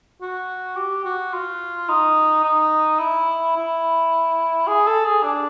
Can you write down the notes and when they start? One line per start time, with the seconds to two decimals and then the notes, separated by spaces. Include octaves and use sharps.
0.21 F#4
0.77 G4
1.05 F#4
1.33 F4
1.89 D#4
2.44 D#4
3.00 E4
3.56 E4
4.67 G#4
4.87 A4
5.05 G#4
5.23 D4